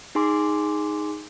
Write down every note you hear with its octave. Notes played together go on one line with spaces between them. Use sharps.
D#4 G#4 G#5 C6 D6